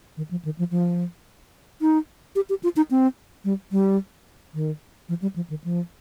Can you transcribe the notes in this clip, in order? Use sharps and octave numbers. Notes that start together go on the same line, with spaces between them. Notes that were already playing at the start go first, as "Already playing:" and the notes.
D#3
F3
D#3
F3
F3
D#4
G4
G4
F4
D#4
C4
G3
G3
D#3
F3
G3
F3
D#3
F3